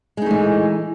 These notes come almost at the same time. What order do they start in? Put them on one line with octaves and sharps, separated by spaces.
G#3 D#4 A3 E3